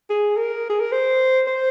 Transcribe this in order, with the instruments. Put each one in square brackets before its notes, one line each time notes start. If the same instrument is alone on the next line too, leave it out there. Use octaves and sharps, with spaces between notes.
[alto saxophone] G#4
A#4
G#4
A#4
C5
C5